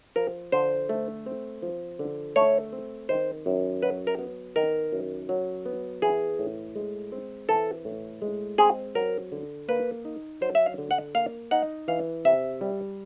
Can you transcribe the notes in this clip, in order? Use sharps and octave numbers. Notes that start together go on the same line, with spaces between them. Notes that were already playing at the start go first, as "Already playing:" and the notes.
F3 A#4
D3 C5
A3
C4
F3
D3
A3 C#5
C4
D#3 C5
F#2
F#3 B4
A#4
B3
D#3 A#4
F#2
F#3
B3
E3 G#4
A2
G#3
C4
E3 A4
A2
G#3
C4 G#4
F#3 A#4
D3
A#3 B4
D#4
F#3 C5
E5
F5
D3
F#5
A#3 F5
D#4 F#5
E3 F5
C3 E5
G3